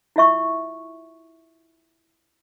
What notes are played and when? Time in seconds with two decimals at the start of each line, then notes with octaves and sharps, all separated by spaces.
0.16 E4 F4 E5 C#6